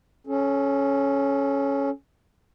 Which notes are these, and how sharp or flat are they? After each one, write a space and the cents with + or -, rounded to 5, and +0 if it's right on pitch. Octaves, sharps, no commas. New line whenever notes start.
C#4 +0 A4 -35